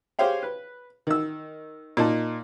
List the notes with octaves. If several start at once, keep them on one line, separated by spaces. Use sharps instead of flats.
G4 G#4 C5 C#5 F5 G5
B4
D#3 E6
A#2 D#4 A5